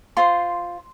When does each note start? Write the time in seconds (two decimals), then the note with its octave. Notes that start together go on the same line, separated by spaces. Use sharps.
0.17 F4 C5 C6